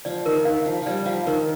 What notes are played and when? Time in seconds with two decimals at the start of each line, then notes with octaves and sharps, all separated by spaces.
0.05 F3 D5
0.26 D#3 A#4
0.45 D#3 F5
0.66 F3 F5
0.82 F3 G3 D5
1.06 F3 F5
1.26 D#3 A#4